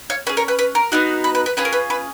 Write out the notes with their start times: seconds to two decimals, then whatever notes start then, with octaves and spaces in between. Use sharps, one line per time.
0.10 C#5 F5
0.27 C#4 G#4 B4
0.37 A#4 C#5
0.48 B4
0.59 B4
0.75 A#4
0.92 B3 D#4 F#4
1.24 B4
1.35 B4
1.46 B4
1.57 C#4 F4 G#4 B4
1.65 A#4
1.73 B4
1.90 B4